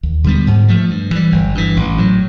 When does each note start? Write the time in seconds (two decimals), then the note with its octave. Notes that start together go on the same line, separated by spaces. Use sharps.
0.03 D#2
0.24 D3 G3 B3
0.47 G#2
0.68 F3 A3
0.90 G2
1.11 E3 G3
1.32 G1
1.55 G2 E3
1.76 A1
1.98 A2 F#3